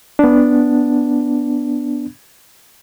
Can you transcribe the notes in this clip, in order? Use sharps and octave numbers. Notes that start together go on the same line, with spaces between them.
B3 D4